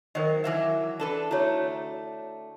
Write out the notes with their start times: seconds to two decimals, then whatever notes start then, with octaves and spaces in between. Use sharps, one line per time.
0.15 D#3 F#3 A#4 C5 D#5
0.44 E3 F#3 E5
1.00 D4 A4 B4
1.31 D3 A3 E4 F#4 C#5